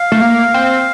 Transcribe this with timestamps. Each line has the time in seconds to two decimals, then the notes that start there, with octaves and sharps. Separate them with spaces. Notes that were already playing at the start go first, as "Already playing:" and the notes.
Already playing: F5
0.12 A3
0.21 A#3
0.54 C4